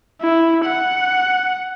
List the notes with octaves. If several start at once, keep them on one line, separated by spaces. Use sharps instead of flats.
E4
F#5